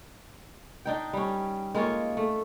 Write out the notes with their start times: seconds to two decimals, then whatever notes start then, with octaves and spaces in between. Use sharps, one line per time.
0.86 D4 D#4 G5
1.13 G3 C#4
1.75 G#3 A#3 F4 C#5
2.17 A3